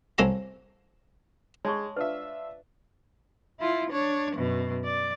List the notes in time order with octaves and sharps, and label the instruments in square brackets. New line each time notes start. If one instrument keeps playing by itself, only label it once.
[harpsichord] C2 C4 A4 C#5 G#5 A#5
[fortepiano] G#3 [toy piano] C#5 A5 C#6
[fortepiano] D4 F4 E5 [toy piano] B4
[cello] E4 F4
D4 C#5
F#2 B2
D5